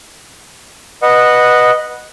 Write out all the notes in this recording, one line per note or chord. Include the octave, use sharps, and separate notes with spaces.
B4 D#5 F#5